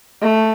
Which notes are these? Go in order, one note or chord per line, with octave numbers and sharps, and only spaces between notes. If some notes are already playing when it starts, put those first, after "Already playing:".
A3